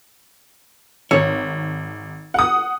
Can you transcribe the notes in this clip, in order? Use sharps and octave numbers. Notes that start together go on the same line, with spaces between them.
G#1 C#5
F#5 D#6